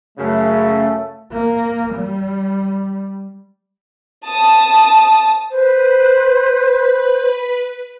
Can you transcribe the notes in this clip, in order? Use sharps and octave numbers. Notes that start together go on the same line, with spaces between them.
F#2 C#3 A3
A#3
G3
A5 D#6
B4 C5